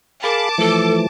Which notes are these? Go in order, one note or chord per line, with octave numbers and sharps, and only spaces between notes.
G#4 A#4 F5 A5 B5 D6
E3 F3 A3 A4